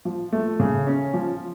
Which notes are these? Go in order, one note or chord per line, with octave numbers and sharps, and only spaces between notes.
F3
A3
C#3
C#4
F3